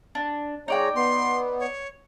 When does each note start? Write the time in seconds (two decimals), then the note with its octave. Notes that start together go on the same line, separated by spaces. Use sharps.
0.15 D4
0.68 G#3 D#4 C#5 D5 G5 A#5
0.96 B3 C6
1.59 C#5